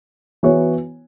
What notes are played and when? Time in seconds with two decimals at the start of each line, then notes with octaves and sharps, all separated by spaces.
0.43 E3 B3 F#4 C#5